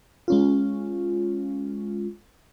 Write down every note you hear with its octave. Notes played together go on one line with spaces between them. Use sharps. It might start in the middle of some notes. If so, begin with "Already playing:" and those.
G#3 C#4 F4